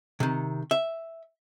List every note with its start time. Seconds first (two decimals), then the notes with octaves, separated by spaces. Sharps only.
0.20 C3 D#3
0.71 E5